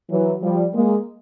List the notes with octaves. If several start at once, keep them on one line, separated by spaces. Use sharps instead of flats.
E3 F#3
F3 G3
G#3 A#3